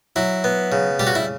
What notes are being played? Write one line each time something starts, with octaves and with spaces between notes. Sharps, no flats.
F#3 E4
B3
C#3
G3 G4
F#4
E4